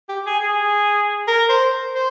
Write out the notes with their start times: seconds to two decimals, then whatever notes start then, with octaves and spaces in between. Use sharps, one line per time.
0.09 G4
0.26 G#4
0.43 G#4
1.27 A#4
1.49 C5
1.95 C5